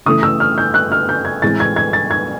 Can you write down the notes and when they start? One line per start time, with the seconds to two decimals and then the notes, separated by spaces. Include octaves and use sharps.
0.06 C#3 E3 A3 D#6
0.23 E6
0.40 F6
0.58 G6
0.74 F#6
0.92 F6
1.09 G6
1.25 G#6
1.42 A2 E3 G#3 C4 A6
1.60 G#6
1.76 G#6
1.93 A6
2.11 G#6